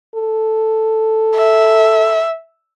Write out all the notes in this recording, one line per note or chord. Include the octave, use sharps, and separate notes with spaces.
A4
E5